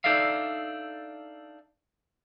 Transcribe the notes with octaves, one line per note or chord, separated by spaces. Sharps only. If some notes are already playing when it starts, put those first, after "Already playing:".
D4 D#4 A4 D5 E5 F5